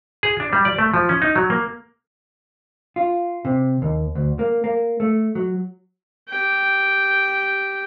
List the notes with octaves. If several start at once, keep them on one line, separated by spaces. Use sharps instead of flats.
G#4
D4
G3
D5
A3
F3
C#4
D#4
F#3
A#3
F4
C3
D#2
D2
A#3
A#3
A3
F#3
G4 G5